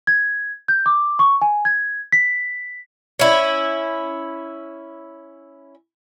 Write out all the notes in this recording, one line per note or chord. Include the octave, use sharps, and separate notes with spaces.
G#6
G6
D6
C#6
G#5
G#6
B6
C#4 E4